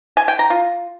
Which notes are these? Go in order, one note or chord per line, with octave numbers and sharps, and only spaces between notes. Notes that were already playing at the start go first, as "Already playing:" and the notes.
G#5
G5
A#5
F4